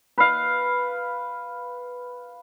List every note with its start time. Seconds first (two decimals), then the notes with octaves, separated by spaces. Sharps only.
0.18 B4 F5